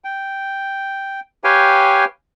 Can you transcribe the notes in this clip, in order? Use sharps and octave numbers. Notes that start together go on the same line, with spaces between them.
G5
G4 B4 C#5 F5 G5 G#5